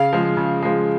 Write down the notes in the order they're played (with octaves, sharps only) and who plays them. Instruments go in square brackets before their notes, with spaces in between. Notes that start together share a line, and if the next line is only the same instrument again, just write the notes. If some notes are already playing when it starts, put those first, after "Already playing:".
Already playing: [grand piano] C#3 [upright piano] F5
[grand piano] F3 G#3
C#3
F3 G#3